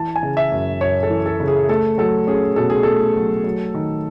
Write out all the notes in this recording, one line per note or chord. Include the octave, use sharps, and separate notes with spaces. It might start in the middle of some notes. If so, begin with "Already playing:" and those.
Already playing: E3 A5
G#5
C#3
E5
F#2
F#2 C#5
A4
E3
A4
C#3
G#4
A3 A4
F#3 A4
C#4 G#4
B2 A4
G#4
A3 A4
F#3
F#3
D#3